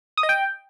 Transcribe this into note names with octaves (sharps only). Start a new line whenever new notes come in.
D#6
D#5
G5